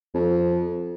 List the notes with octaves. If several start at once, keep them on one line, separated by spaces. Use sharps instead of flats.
F2